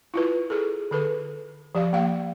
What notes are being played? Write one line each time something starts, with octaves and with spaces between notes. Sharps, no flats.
E4 F4 B4
G#4 A4
D3 A4 B4
F3 G4 D5 F5
A#3 F5 G5